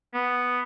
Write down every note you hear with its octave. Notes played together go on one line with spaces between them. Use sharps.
B3